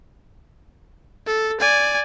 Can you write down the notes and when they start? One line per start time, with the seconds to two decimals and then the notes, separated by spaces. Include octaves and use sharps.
1.26 A4
1.60 D5 G#5